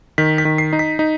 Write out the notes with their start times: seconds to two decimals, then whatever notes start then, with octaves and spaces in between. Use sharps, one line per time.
0.18 D#3 B6
0.38 B6
0.45 D#3
0.58 C7
0.73 D#4
0.79 B6
0.99 D#4